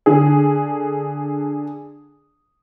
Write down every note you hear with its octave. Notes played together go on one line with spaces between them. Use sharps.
D3 G#4